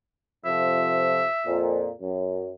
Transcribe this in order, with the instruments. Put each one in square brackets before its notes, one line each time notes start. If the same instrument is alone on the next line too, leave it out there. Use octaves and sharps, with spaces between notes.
[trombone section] F2 C3 F3 [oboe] E5
[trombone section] F2 A#2
F#2